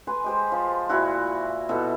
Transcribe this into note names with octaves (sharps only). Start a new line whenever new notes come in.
B4 G#5 C6
G#3 G4 C5
F3
A#2 E4 F#4 A5
B2 B3 E4 A4